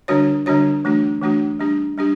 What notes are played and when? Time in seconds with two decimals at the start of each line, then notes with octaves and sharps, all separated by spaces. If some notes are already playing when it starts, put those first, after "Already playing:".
0.08 D3 G3 D4 F#4 C#5
0.46 D3 G3 D4 F#4 C#5
0.85 E3 A3 D4 F#4
1.22 E3 A3 D4 F#4
1.59 G3 D4 G4
1.98 G3 D4 G4